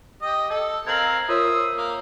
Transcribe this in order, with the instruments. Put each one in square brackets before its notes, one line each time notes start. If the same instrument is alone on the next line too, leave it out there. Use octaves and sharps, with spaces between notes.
[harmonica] G4 D#5
[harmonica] A4 [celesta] D#5
[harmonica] C4 A#4 F5 [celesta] G#6 F#7
[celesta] F4 A#4 C#5 [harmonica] C5 E5 D#6
[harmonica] A#3